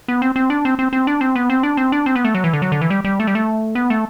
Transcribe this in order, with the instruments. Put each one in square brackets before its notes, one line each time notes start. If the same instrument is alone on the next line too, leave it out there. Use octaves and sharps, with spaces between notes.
[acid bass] B3
C4
C4
D4
C4
C4
C4
D4
C4
B3
C4
D4
C4
D4
C4
B3
A3
F#3
E3
D3
F#3
D3
E3
G3
G3
A3
G3
A3
B3
A3